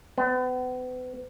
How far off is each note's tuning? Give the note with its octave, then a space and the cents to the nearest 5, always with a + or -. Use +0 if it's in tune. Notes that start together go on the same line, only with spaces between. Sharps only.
B3 +40